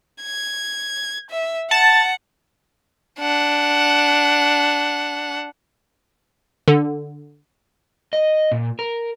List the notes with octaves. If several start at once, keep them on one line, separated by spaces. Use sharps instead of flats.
G#6
E5
F#5 A5
D4 F#5
D3
D#5
A#2
A#4